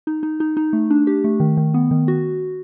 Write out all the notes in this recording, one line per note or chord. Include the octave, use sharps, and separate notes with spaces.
D#4
D#4
D#4
D#4
A3
D4
G4
A3
D#3
D#3
B3
D#3
F#4